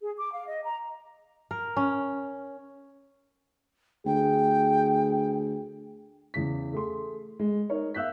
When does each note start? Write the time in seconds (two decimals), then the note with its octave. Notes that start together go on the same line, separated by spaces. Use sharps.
0.01 G#4
0.17 D6
0.34 F5
0.47 D#5
0.64 A#5
1.51 A#4
1.77 C#4
4.06 D2 G#4 G5
6.34 E2 C#3 B6
6.73 A3 G#4 C6
7.40 G#3
7.70 D#4 A#4 C#5
7.94 E5 F5 E6 F#6 G6 B6